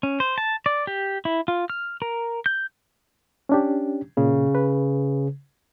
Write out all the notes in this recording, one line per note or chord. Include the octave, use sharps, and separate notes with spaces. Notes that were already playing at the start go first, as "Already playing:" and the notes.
C#4
C5
A5
D5
G4
E4
F4
F6
A#4
G6
C#4 D4 G4
A#2 C#3
B4